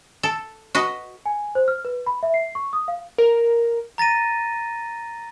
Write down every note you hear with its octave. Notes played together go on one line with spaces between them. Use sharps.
A4
F#4 B4 D#5
G#5
C5
F6
B4
B5
E5
C7
C#6
D#6
F5
A#4
A#5 A6 A#6 D#7